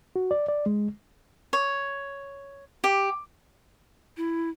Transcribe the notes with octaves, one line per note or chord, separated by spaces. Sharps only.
F#4
D5
D5
G#3
C#5
G4
E4